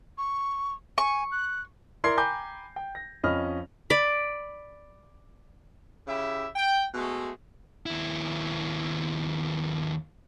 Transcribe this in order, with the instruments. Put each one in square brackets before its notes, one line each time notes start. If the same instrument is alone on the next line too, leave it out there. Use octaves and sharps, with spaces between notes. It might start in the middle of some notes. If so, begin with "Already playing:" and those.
[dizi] C#6
[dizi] G#5 [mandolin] C#6
[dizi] F#6
[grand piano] E4 A#4 D5 C6 G#6 C7
G5 G#5 A#5 B5 D6 G6
G5
A#6
F2 C#4 F4 D#5 B5 F6
[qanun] D5 B5
[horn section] C#3 E4 G4 E5
G5
B2 G#3 A3
[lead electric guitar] D#2 E4